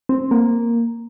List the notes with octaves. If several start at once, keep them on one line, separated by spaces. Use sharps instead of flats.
C4
A#3